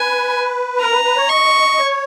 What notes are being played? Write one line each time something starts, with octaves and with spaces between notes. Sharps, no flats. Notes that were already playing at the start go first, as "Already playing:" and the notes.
Already playing: B4 G#5
A#4 A#5
B4
B4
C#5
D#5 C#6
C#5